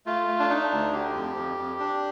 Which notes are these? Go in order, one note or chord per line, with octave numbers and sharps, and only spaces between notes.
A3 F4
A3
D4
D4 D#4
D2
D3 G4
F2
F2
F2
D4